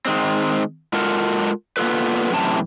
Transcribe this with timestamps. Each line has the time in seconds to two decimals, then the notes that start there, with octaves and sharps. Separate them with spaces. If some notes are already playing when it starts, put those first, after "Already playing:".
0.05 D#3 G#3 C4
0.93 G#3 F4 F#4 A4 A#4
1.77 A#3 B3 F4 A4 B4
2.32 F#2 A2 C3 E3 A5